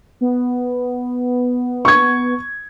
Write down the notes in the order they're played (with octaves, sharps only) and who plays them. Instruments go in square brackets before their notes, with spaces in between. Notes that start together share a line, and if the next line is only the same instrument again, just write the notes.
[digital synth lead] B3
[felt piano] C#6 G#6